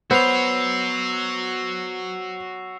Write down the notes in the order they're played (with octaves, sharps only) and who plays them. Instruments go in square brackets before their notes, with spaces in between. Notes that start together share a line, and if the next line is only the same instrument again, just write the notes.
[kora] B3 [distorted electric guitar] F#4 C#5 [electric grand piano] C5 [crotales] E6 C7 F7